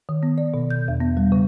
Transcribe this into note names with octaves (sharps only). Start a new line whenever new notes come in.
D#3
B3
D5
B2
G6
E2
B3
G3
C#3